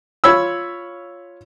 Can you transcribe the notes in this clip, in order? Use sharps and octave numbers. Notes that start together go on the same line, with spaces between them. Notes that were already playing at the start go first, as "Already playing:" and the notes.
F4 C#5 B5 E6